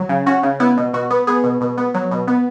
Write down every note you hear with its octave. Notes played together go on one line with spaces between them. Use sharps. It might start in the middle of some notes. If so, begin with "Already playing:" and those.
Already playing: F#3
C#3
C#4 F#4
C#3
B3 E4
B2
B2 F#4
B3
B3 G#4
B2
B2
B3
F#3
B2
B3